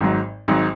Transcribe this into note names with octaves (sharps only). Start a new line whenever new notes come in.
G#1 G#2 F#3
G#1 G#2 F#3